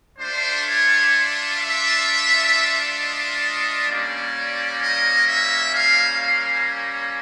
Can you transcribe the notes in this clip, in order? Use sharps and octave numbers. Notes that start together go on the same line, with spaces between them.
A3 D4 F4 C5
C#5
E5
D#5
G3 A#3 C#4 D5
D#5
E5
F5
F5